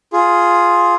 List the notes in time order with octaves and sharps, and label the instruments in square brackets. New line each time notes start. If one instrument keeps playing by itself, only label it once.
[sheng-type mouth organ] F4 G#4